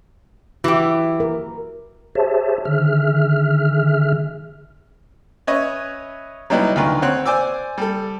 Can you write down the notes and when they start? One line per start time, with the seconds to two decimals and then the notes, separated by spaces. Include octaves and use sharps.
0.64 E3 F#4 G4
1.20 A#4
2.15 G4 G#4 C5 C#5 E5 A5
2.65 D3 D#3 G#4 E5 F6
5.47 C#4 B4 C#5 D#5 E5
6.50 F#3 G3 B3 D#4 E4
6.76 D2 D#3 F4 B4
7.02 C4 C#5 F#5 C6 F#6
7.26 C5 D5 G#5 D6 E6
7.78 G3 A4